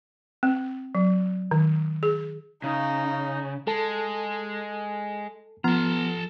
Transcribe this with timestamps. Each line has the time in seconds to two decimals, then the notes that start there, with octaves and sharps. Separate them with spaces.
0.43 C4
0.95 F#3
1.51 D#3
2.03 G#4
2.64 C#3 D#4
3.67 G#3 A4 A5
5.64 F3 B3 A4 A#5